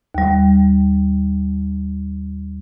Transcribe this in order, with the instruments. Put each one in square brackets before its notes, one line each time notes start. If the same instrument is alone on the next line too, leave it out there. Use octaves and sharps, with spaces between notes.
[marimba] D#2 G3